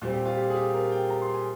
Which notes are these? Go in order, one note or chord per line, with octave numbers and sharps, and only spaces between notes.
A#2 G3 C4
G4
F4
G4
G#4
G4
A#4
G5
A#5
C6
G#5